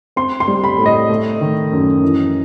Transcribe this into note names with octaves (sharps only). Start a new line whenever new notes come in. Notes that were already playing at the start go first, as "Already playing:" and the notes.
C4 C6
C6
G3
B5
A2
D#5
A3
D#3
F#2
E3